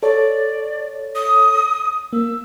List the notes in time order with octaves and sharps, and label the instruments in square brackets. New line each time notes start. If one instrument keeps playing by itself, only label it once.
[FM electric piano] A4 C#5 [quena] D5
[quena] D#6
[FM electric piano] A#3 [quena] E6